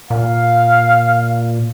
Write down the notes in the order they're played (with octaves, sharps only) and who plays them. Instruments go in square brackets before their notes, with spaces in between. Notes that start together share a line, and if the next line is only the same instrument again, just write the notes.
[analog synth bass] A#2 [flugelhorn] F5